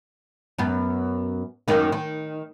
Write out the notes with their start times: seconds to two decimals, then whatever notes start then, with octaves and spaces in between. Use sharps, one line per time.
0.59 F#2 B3
1.68 F#2 D#3 A#3
1.92 D#3